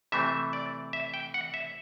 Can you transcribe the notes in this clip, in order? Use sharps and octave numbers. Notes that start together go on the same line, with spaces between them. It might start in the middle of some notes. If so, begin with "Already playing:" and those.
C3 E3 A3 C4 E5
D5
E5
G5
F#5
E5